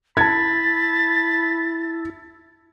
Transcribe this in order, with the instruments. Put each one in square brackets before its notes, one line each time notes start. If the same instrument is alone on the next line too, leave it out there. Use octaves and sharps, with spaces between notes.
[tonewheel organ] E4 [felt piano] A5 G#6 [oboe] B5 [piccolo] A6